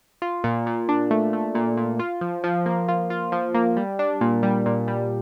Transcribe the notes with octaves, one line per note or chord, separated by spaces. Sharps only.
F4
A#2
A#2
D4
A3
A3
A#2
A#2
F4
F3
F3
A#3
F4
F4
F3
A#3
G3
D4
A#2
G3
A#2
G3